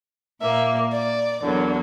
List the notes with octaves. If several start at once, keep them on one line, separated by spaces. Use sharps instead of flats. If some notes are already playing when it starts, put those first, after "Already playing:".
A#2 A#3 E5
D5
E2 D3 F#3 A#3